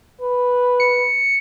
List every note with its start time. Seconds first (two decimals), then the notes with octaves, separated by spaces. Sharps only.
0.21 B4
0.80 C#7